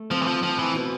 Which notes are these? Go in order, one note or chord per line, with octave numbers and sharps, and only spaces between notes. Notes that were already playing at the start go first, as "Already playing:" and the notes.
Already playing: A3
F3 C4
E3
F3
F3 C4
E3
B2